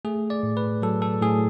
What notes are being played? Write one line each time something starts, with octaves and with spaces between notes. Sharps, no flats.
A3 G#4
D5
A2
B4
F#3 A4
A4
A2 G#4